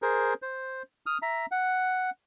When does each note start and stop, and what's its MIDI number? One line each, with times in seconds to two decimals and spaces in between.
0.02 0.34 68
0.02 0.34 70
0.02 0.34 72
0.42 0.83 72
1.06 1.18 87
1.06 1.18 89
1.22 1.46 76
1.22 1.46 82
1.51 2.10 78